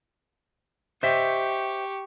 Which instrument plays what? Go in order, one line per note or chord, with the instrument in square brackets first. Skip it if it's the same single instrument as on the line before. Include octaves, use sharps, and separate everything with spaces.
[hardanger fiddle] G4 C#6 [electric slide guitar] C5 D#5 E5